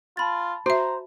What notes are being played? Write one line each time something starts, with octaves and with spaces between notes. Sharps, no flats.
F4 A5 B5 A6
F#4 C5 E5 A#5